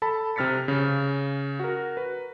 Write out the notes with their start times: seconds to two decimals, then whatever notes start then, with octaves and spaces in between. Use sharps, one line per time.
0.02 A4 A5 B5
0.36 C3 C4 F6 A6 B6 C#7
0.68 C#3
1.60 F#4 A#4
1.97 B4